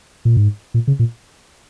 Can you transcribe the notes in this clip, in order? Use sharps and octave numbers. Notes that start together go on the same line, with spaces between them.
A#2
G#2
A#2
C#3
A#2